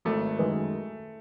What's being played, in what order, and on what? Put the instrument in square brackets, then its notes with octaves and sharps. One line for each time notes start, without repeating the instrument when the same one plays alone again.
[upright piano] G#1 [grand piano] A3
[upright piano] F#2 D#3 G#3